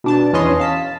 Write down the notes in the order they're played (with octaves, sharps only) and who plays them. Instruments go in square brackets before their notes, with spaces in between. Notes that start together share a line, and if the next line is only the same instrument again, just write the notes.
[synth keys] B2 D4 A5
E2 C#4 B4 C#5 D#5 C6
F5 A5 B6